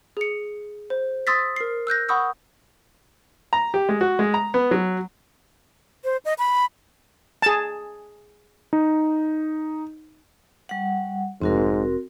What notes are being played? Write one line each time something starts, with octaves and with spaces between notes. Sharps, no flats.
G#4 C#7
C5
C6 D#6 E6 A6 B6
A#4 C7
E6 F#6 G6 A#6
F#5 B5 C#6 D#6 E6 G6
A#5
G4
G#3
F#4
G#3
A#5
B3
F#3
C5
D#5
B5
G#4 A5
D#4
G3 F#5
F1 G#2 C4 F#4 A#4